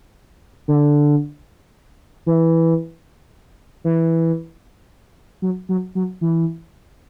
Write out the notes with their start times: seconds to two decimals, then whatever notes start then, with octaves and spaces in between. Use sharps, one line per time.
0.68 D3
2.26 E3
3.84 E3
5.42 F#3
5.69 F#3
5.95 F#3
6.21 E3